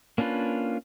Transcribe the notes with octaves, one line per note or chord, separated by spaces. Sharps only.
A#3 C#4 D4 F4 B4